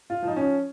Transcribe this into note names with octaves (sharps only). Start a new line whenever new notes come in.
F4
F3 D#4
C#4